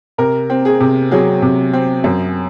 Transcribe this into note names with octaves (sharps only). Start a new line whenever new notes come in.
C3 A#4
C4
G#4
C3
F#3 G#4
C3
C4
F#2